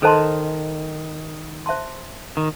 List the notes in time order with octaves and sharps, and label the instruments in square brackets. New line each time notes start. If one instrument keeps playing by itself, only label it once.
[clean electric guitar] D#3 [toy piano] A4 C5 D#5 A5 C6
[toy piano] C5 E5 A5 C6
[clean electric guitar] D#3